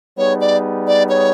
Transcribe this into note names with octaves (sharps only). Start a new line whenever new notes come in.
G3 B3 D#4 G#4 C#5
D5
D5
C#5